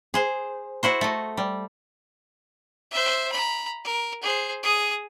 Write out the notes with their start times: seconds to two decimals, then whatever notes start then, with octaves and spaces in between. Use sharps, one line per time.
0.14 G#4 C5
0.83 E4 F#4 C5
1.01 A3 D#5
1.37 G3
2.91 C5 E5
3.32 A#5 B5
3.84 A#4
4.22 G#4 C5
4.63 G#4 D#6